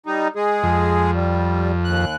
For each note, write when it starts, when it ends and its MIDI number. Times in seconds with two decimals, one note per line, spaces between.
0.06 0.28 55
0.06 0.28 63
0.35 1.11 56
0.35 1.11 68
0.63 2.05 41
1.14 1.71 55
1.84 2.16 39
1.84 2.16 90